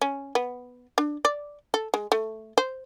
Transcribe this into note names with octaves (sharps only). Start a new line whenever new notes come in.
C#4
B3
D4
D5
A4
G#3
A3
C5